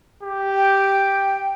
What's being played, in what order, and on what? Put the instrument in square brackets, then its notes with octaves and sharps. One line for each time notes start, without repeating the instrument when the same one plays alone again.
[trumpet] G4
[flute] G5